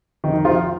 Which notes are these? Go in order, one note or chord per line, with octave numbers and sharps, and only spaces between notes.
F2 D#3 D#4
F3 F4